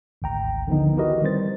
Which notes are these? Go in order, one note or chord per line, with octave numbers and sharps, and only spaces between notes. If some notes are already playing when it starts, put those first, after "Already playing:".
G#1 D2 G5 A#5
D3 D#3 F3 B3 D#4
E4 F#4 G4 A#4 B4 D#5
D#3 G3 C4 C5 A6